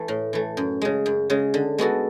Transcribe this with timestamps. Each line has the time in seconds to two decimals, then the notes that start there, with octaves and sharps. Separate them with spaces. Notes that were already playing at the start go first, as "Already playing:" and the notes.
Already playing: E3 A3
0.08 A2
0.33 E3 A3
0.57 F#2
0.82 C#3 G#3
1.06 F#2
1.30 C#3 G#3
1.54 D3
1.78 G#3 B3 F#4 A4